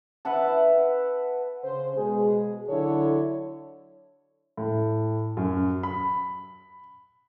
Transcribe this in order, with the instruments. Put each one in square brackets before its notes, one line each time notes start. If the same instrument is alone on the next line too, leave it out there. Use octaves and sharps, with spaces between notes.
[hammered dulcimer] B4 E5 F#5 A5
[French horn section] C#3 C5
B2 G#3 G#4
D3 F#3 E4 A4 C#5
[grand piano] A2
F#2
B5